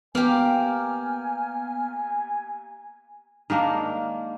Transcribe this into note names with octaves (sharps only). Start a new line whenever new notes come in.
A#3 B3 G4 G#5 F6
D#3 G#3 A#3 D4